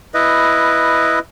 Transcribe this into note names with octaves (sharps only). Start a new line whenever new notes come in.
E4 B4 D#5